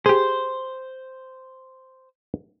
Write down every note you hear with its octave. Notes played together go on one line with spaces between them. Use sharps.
G4 G#4 C5